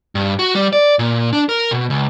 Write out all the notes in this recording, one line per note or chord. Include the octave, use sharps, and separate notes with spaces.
G2
F#4
G3
D5
A#2
D4
A#4
B2
C#2